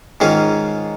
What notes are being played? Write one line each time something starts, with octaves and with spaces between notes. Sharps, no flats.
G#2 D#3 C#4 F4